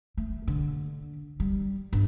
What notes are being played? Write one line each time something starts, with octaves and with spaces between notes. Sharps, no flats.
A3
D3
G3
G1